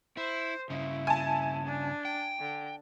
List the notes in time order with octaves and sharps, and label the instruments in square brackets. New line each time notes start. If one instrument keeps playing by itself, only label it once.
[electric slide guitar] E4 [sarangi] C5
[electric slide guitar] G2 C#3 [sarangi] E4
[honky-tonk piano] G#5 A5
[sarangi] D4
[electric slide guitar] G5
[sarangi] D3